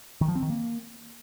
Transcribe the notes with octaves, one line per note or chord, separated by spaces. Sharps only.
D#3
F3
C4
D#3
A#3